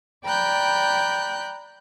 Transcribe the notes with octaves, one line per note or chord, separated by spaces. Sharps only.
D5 G5 A#5 B5 F#6 G6